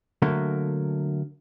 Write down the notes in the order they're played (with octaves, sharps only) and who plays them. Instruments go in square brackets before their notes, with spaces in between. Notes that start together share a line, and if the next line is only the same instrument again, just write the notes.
[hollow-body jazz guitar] D3 F#3 A3 A#3